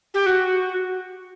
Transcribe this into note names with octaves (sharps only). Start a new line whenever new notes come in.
G4
F#4